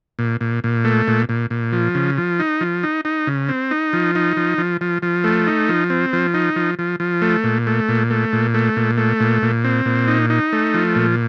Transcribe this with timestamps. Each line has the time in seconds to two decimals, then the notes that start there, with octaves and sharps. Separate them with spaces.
0.19 A#2
0.41 A#2
0.64 A#2
0.85 A3
1.07 A#2
1.29 A#2
1.50 A#2
1.73 F3
1.95 C#3
2.18 F3
2.40 D#4
2.61 F3
2.83 D#4
3.05 D#4
3.27 C#3
3.49 C4
3.71 D#4
3.93 F3
4.15 D#4
4.37 F3
4.58 F3
4.81 F3
5.02 F3
5.24 A3
5.47 D#4
5.69 F3
5.90 C4
6.13 F3
6.34 D#4
6.56 F3
6.79 F3
7.00 F3
7.22 A3
7.44 A#2
7.67 A3
7.89 A#2
8.10 A3
8.33 A#2
8.54 A3
8.76 A#2
8.98 A3
9.20 A#2
9.42 A#2
9.64 C4
9.85 A#2
10.08 D#4
10.30 D#4
10.53 A3
10.74 F3
10.95 A#2